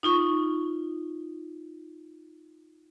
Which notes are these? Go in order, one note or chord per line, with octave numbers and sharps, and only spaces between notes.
D#4 F4 C#6